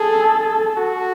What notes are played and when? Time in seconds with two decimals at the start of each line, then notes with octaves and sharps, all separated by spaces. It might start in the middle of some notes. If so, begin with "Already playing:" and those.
Already playing: G#4 A4
0.78 F#4